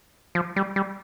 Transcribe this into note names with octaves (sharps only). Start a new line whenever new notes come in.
F3
G3
G3